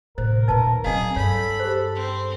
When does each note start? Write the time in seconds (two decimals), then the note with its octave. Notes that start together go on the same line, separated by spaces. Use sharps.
0.18 A2 C3 A#4 C5
0.48 D#2 A#2 D#4 B4 A5
0.84 F#3 C4 G#4 D#5 F5
1.16 G2 A4 C#5 B5
1.60 G4 G#4 C5
1.95 C4